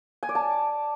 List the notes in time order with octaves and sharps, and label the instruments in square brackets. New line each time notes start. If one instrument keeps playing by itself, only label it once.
[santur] G#5
D5
A5